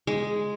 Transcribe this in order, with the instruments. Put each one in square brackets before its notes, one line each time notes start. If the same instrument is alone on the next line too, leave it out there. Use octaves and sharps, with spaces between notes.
[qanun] G#3